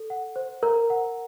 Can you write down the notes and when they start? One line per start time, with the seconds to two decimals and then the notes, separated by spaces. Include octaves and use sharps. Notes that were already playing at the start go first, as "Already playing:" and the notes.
Already playing: A4
0.10 F#5
0.36 C5
0.63 A#4 A#5
0.90 F#5